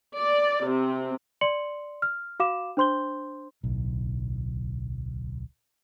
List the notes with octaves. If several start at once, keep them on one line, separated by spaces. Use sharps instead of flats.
D5
C3
D5 C6 C#7 F#7
F6
F#4 F5 D6 E7
D4 C5 C6 G6 G7
D1 B1